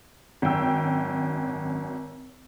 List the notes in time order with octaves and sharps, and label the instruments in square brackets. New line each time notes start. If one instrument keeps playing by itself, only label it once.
[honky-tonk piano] G#1 F#2 G5 E6